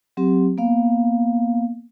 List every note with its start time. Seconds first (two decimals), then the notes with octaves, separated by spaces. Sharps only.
0.17 F#3 C4 G4
0.58 A#3 B3 F5